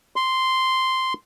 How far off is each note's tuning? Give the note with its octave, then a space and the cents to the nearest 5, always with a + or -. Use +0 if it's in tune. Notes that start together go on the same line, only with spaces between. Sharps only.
C6 -5